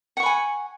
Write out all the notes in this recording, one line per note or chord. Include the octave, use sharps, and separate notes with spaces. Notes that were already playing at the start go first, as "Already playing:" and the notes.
F#5 G#5 B5 C#6